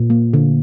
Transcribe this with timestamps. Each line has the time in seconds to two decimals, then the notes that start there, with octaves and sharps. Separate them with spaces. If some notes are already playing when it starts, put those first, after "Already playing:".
Already playing: A#2
0.10 A#3
0.33 D3